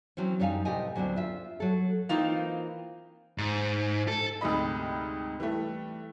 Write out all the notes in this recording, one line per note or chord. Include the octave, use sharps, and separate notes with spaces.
E3 F#3 C4 C#4
F#2 G3 D#4 G4 F5 G#5
A2 C3 G4 D#5 G#5
D2 F#3 B3 C4 D4
F4 E5
F#3 A4
E3 A#3 C4 D#4 F4
G#2
A4
D2 G#2 C3 D#5 B5
E3 G3 A3